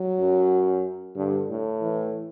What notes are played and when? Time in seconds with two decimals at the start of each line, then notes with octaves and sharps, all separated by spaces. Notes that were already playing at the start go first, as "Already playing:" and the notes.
Already playing: F#3
0.20 F#2
1.16 G2 D3
1.49 A2
1.81 E3